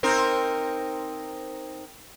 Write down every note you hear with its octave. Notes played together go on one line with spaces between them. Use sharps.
C4 D#4 A#4